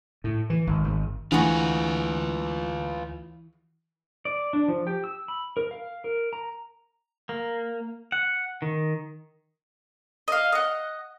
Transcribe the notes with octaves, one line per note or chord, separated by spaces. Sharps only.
A2
E3
G#1
G#1
D2 E3 A3 D4 F4 F#4 G#4 B4
D5
D4
F3
G4
E6
B5
A#4
F5
A#4
A#5
A#3
F#5
D#3
D#5 F5
D#5 F#5